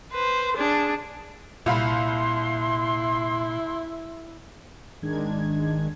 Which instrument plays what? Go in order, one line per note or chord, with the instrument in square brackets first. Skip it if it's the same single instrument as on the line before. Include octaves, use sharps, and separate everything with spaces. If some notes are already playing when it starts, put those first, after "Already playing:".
[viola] B4 C5
D4 G#4
[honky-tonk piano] C2 F5 B5 [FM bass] A#2 [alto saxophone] E4 [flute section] C6
[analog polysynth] G#1 D#3 G#3 D4 G#6